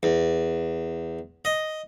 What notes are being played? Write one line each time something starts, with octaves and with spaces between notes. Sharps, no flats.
E2
D#5